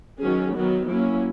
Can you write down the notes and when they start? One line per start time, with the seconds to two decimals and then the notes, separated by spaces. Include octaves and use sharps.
0.19 D#3 F#3 C#4 G#4
0.54 D#3 F#3 B3 F#4
0.89 F#3 A#3 C#4 E4